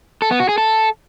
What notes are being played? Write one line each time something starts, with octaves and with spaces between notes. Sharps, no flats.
A4
B3
F#4
G#4
A4